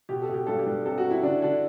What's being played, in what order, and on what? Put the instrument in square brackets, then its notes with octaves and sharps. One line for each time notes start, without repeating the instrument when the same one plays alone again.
[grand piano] B2 [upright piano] G4
[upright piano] A4
[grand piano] B2
[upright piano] G4
[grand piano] G2 [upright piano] A4
[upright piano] G4
[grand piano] G2
[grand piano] C3 [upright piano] A4
[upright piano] F#4
[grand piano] C3
[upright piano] E4
[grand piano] D3 [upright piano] D4
[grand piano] D3 [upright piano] D4